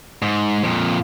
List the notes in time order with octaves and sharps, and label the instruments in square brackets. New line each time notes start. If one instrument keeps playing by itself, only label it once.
[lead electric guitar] G#2
F2 A#2